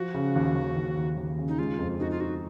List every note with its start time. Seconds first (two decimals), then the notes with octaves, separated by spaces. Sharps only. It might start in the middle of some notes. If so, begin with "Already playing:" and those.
Already playing: F3 F#4
0.14 C#3
0.36 D#2
0.55 D#2
0.76 D#2
0.97 D#2
1.18 D#2
1.38 C#3
1.48 D#4
1.59 G#3 F4
1.79 F2
2.00 D#4 F#4
2.11 F4
2.20 D#4 F#4